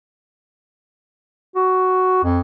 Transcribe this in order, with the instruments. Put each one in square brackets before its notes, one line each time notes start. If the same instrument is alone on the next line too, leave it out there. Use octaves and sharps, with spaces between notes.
[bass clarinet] F#4
F2